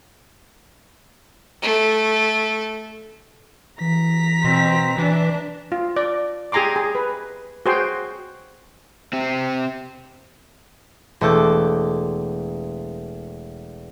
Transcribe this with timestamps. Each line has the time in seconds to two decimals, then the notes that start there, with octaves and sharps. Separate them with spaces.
1.62 A3
3.80 E3 A#5 B6
4.44 B2 C4
4.98 E3 D4
5.72 F4
5.96 D5
6.52 G4 G#4 G#5 A#5 C6 D6
6.76 G#4
6.95 B4
7.66 F#4 G#4 C5 G5 C6
9.13 C4 G4
11.21 E1 A3 A4 D6 G6